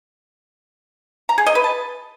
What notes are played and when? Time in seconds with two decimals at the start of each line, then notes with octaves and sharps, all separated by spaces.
1.29 A#5
1.38 G#4
1.46 D#5
1.55 B4
1.64 A5